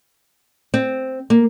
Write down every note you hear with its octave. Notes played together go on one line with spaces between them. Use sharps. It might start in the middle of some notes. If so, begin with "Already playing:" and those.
C4
A#3